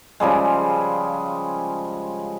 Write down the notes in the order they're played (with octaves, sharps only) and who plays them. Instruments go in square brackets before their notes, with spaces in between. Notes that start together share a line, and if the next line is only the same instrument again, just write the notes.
[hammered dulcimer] C#3 F3 G3 G#3